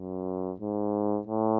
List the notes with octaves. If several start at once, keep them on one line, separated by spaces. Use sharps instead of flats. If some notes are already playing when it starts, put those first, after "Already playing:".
Already playing: F#2
G#2
A2